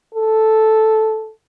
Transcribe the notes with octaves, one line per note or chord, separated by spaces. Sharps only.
A4